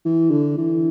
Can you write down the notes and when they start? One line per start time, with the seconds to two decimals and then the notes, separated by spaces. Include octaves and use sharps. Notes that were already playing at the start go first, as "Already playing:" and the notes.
0.05 E3
0.31 D3
0.57 E3